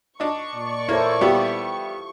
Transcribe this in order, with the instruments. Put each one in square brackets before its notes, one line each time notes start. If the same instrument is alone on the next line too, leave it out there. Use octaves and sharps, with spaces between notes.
[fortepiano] D4 D#4 [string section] C#6
[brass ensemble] A#2 D5
[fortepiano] A#3 C#5 [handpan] E4 A4 C5
[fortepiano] G3 B3 E4 [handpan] F4 G4